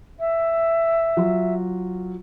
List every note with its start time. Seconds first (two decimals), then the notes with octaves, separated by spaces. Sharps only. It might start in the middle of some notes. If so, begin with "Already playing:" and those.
0.19 E5
1.17 F#3 F4